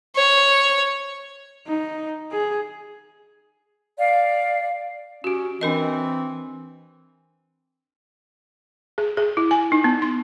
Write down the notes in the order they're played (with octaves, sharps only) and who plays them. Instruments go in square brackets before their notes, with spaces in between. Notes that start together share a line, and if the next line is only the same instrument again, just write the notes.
[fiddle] C#5
[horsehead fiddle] D#4
G#4
[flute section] D5 F5
[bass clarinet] C#4 [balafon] F#4 G4
[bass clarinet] E3 [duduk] C4 [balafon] D4 A#4 D#5
[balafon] G#4
G#4
E4
G#5
D#4
B3
C6